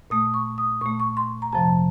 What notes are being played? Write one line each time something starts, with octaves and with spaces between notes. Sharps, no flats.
A#2 A3 D#6
C#6
D#6
A#2 A3 C#6
C#6
C6
A#5
F2 C3 F3 A5